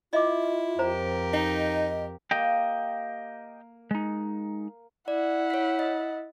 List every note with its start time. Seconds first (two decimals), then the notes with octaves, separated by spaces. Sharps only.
0.13 E4 F4 D#5 E5 D6
0.79 F2 G4 A#4 C5 A#5
1.34 D#4 D#5
2.31 A#3 G4 D#5 G5
3.91 G#3 D#4
5.08 E4 D5 F#5
5.50 C#5 B6
5.79 D#5